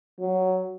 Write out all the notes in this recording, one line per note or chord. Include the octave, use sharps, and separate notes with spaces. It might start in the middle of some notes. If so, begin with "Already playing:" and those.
F#3